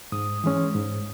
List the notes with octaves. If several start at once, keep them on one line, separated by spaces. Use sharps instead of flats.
G#2 D#6
E3 G#3 C#4
G#2